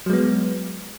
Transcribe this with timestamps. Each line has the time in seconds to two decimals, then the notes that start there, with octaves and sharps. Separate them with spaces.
0.06 F#3
0.10 G#3
0.13 B3